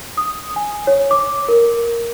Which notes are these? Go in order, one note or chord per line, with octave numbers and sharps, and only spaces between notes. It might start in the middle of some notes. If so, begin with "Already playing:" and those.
D#6
G#5
C#5
D6
A#4